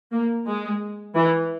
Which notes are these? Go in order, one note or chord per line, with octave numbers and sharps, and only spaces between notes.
A#3
G#3
E3